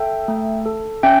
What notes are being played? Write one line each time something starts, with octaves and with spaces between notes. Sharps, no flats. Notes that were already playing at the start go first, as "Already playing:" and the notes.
Already playing: A4 E5 G5
A3
A4
C#4 E5 G5